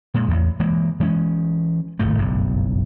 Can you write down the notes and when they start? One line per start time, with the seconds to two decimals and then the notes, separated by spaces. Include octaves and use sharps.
0.14 A#2 G#3
0.28 A1 E2
0.60 E3 G#3 A#3
1.00 E3 G#3 A#3 C#4
1.99 D1 G#1 A#2 A3
2.18 F#1 B1 G2